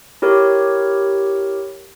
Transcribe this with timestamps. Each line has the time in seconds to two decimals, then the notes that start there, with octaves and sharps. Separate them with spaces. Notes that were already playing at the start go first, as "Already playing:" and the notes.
0.22 E4 G4 A#4 C#5